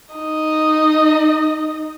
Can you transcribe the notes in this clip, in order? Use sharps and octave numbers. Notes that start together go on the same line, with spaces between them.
D#4 D#5